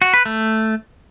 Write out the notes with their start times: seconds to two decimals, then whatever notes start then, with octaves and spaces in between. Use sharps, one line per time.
0.02 F#4
0.14 B4
0.26 A3